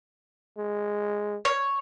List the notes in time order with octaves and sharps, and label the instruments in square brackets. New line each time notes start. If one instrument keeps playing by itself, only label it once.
[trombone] G#3
[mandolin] C#5